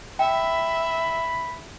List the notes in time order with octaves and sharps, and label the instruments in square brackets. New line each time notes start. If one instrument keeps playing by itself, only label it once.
[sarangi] E5 [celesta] G5 [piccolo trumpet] B5